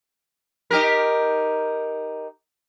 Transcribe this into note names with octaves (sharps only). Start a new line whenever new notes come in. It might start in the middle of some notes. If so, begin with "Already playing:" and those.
D#4 G4 A#4